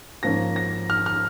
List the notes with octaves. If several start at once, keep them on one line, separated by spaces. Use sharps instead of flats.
G#2 F3 A#3 C#4 A#6
A#6
F6
F6